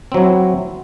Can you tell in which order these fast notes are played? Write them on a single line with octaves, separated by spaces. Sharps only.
C4 F#3 E4